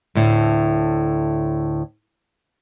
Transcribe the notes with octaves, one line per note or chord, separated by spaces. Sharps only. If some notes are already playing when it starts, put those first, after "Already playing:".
D2 A2